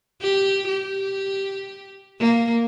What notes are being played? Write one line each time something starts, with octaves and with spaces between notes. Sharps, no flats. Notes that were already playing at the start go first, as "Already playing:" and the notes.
G4
G4
A#3